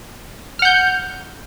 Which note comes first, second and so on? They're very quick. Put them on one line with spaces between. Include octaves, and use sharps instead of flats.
F6 F#5 G6